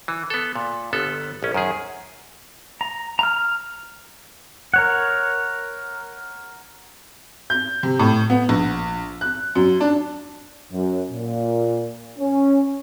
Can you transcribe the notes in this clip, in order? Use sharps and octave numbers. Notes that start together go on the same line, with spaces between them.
E3
B3 A4
A#2
G1 B3 A4
A#1 C#4
F#2 D#3 G#4
A#5
A#5 F6
A#4 C#5 F#5
G6
C3
A2
B3
A#1
F#6
F#2
D4
F#2
A#2
C#4